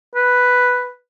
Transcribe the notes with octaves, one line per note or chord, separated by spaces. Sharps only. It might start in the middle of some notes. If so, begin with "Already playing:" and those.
B4